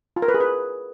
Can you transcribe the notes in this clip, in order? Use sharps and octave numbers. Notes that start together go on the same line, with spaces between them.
F4
A#4
B4
G#4
B4